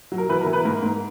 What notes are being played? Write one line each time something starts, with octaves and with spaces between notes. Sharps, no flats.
F#3
A#4
E3 B4
A#4
E3
B4
G#2 A#4
G#2